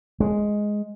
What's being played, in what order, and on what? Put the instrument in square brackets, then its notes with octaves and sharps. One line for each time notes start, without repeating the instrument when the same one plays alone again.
[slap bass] G#3